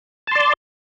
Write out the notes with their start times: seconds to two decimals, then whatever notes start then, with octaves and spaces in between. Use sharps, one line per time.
0.27 A5
0.31 C6
0.35 D5